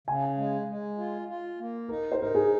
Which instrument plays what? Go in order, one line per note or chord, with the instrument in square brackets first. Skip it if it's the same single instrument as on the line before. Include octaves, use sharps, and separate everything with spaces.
[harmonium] C#3 [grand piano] G#5
[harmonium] G#3
G#3
F4
F4
A#3
[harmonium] D#4 [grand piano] A#4
[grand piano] C5
[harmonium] D#4 [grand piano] A#4
[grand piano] G#4